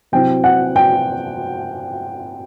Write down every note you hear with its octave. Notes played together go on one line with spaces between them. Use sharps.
C3 F#3 C4 E4 G5
F#5
G5